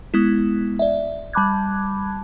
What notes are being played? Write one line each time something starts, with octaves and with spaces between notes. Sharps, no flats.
G#3 B3 E4
D5 E5
G3 A5 B5 D6 F#6 G#6